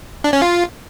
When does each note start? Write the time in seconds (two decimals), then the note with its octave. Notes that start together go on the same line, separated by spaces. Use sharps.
0.24 D4
0.33 C#4
0.42 F4